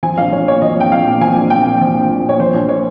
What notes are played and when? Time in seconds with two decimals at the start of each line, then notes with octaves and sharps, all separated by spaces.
0.03 F3 G#5
0.18 A#1 F5
0.32 A#1 C#5
0.47 A#2 C#5
0.62 F3 D#5
0.77 A#1 G5
0.92 A#1 F5
1.07 A#2
1.21 F3 G#5
1.36 A#1
1.50 A#1 G5
1.66 A#2
1.81 F3
1.95 A#1
2.11 A#1
2.24 A#2 C#5
2.39 F3 C5
2.54 A#1
2.69 A#3 C#5